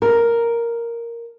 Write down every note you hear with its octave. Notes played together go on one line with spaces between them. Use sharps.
A#4